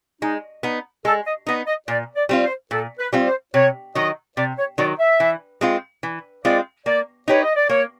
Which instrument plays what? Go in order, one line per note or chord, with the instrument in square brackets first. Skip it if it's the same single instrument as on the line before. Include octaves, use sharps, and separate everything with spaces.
[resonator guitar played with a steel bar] G#3 [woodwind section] D#4
[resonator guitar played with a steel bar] B3 D#4
[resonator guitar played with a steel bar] G#3 [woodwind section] A4
[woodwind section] D#5
[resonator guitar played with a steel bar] B3 D#4 [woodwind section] D#5
[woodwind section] D#5
[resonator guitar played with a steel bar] A#2 [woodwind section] D5
[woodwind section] D5
[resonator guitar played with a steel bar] G3 C4 F4
[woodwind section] C5
[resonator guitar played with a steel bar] A#2 [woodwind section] A4
[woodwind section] B4
[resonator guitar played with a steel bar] G3 C4 F4
[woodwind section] C5
[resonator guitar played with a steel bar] C3 [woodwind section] C#5
[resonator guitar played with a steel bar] D#3 F#3 [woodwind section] D#5
[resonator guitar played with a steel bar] C3 [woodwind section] D5
[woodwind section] C#5
[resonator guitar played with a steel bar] D#3 F#3 [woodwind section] D5
[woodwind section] E5
[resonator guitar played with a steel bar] E3
G#3 C4 F4
E3
[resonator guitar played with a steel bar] G#3 C4 F4 [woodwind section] D5
[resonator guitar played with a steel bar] A#3 [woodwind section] D5
[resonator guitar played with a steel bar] D#4 G4 B4 [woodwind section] C#5
[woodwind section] D#5
D5
[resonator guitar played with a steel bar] A#3 [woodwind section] C#5